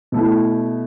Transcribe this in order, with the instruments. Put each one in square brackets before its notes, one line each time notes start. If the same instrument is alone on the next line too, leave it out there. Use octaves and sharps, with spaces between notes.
[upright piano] B2 A3 E4